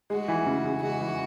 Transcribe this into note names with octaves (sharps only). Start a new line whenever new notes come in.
G#3 F#4
E3
C#3
C#3
G#3 F#4
E3